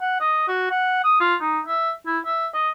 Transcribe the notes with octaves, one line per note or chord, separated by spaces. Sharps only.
F#5
D#5
F#4
F#5
D#6
F4
D#4
E5
E4
E5
D#5